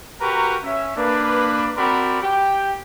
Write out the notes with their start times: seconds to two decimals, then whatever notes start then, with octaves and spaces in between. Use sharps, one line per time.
0.21 F#4 G4 A#4 B4 A#5 C#6
0.63 C#4 E5
0.97 A#3 D4 B4
1.77 C4 F#4 A#4 D5 B5
2.22 G4 G5